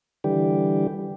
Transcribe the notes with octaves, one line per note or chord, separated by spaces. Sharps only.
D3 E3 G3 G4